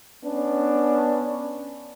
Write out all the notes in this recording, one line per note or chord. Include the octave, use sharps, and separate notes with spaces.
B3 C#4 D4